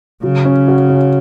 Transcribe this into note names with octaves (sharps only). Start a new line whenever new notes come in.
C#3 F#3
C#4
F#4
C#4